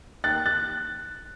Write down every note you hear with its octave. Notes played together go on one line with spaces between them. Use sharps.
D#2 F#6 A6
F#6 A6